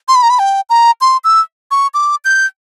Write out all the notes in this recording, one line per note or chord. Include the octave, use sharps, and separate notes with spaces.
C6
B5
A#5
B5
G5
A#5
C6
E6
C#6
D6
G6